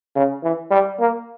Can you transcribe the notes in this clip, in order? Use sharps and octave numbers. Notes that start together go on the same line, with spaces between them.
C#3
E3
G3
A#3